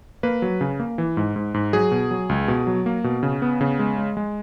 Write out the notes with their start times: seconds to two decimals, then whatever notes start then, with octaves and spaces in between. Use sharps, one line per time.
0.23 A#3 B4
0.42 F#3
0.61 C#3
0.80 A#3
0.98 E3
1.17 G#2
1.36 G#2
1.54 G#2
1.73 F#3 G#4
1.91 B2
2.11 F#3
2.29 C#2
2.48 B2
2.67 F#3
2.86 A#3
3.04 B2
3.23 C#3
3.42 B3
3.61 C#3
3.79 G#3
3.98 G#3
4.17 G#3